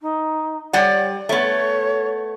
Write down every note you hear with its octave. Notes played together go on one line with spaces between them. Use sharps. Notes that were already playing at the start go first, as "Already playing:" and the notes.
D#4
G3 C#5 D5 F#5
A3 B3 C#5